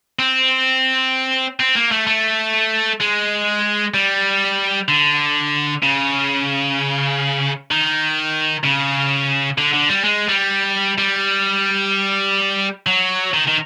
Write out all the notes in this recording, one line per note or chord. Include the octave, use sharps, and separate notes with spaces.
C4
C4
A#3
A3
A3
G#3
G3
D3
C#3
D#3
C#3
D3
D3
G3
G#3
G3
G3
F#3
D#3
D#3